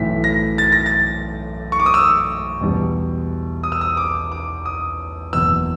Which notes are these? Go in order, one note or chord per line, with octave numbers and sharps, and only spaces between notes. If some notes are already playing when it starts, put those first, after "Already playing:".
Already playing: B1 A2 E3 B6
A#6
A6
A#6
A6
C#6
D6
D#6
E6
E2 B2 G3
D#6
E6
D#6
D6
D6
D#6
F#1 E2 B2 E6